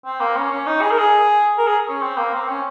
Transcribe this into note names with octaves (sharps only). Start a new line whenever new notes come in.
C4
A#3
C#4
C#4
D#4
G#4
A#4
G#4
A#4
G#4
C#4
C4
A#3
C4
C#4